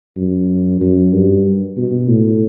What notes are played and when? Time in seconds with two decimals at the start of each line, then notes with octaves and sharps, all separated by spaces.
0.17 F#2
0.81 F#2
1.13 G2
1.77 B2
2.09 A2